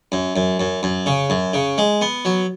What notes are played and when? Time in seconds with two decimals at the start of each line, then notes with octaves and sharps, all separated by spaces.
0.12 F#2
0.36 F#2
0.60 F#2
0.83 F#2
1.06 C#3
1.30 F#2
1.54 C#3
1.78 G#3
2.01 B3
2.25 F#3